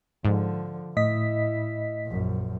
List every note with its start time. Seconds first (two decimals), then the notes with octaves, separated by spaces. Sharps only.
0.25 G#2 D3 F3
0.96 A2 E4 D#5 B6
2.06 A#1 F#2